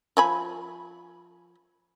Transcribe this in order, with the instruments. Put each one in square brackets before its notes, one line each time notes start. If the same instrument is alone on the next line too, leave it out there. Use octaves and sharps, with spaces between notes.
[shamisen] F3 G#5 B5